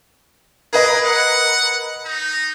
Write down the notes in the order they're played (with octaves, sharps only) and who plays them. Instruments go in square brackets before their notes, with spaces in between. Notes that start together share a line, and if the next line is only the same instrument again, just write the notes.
[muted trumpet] G#4 [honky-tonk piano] A#4 B4 D#5
[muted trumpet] F#5
D#4